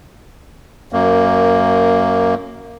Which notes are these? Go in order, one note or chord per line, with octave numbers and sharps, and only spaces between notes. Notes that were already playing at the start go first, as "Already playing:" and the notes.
F#2 A#3